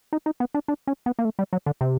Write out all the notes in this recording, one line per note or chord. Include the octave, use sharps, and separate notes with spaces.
D#4
D#4
B3
D4
D4
C#4
B3
A#3
A3
G3
F#3
D3
C3